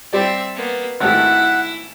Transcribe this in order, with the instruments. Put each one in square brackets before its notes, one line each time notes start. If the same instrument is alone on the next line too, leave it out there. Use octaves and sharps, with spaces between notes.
[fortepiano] G3 D5 [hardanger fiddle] C4 E5
[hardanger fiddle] A#3 B3
[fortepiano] G#1 A3 G4 [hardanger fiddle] E4 [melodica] F#5